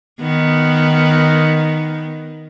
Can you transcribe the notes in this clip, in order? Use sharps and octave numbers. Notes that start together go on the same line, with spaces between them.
D#3 B3